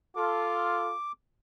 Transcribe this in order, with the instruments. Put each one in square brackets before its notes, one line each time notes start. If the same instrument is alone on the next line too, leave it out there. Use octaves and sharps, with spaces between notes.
[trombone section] F4 A4 [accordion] D6